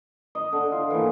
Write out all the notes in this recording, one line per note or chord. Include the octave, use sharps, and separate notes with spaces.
D#5
D3
F4
A#2 E3